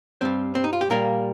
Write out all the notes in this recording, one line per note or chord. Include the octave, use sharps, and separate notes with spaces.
G2 G3 C4 C5
C4
D#4
F4
G4
A#2 G3 A#3 A#4